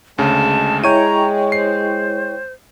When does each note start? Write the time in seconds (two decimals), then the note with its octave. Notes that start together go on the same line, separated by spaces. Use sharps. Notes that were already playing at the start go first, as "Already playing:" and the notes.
0.18 D2 C#3 G#3 A5
0.84 E4 C#5 G5 A#5 D#7
1.52 C5 C7